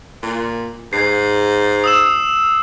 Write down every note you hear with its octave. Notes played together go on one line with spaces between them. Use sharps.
A#2
G#2 C7
D#6 E6 E7